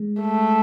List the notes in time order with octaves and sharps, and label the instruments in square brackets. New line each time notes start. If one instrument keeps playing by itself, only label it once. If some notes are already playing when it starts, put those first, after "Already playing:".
Already playing: [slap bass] G#3
[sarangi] A3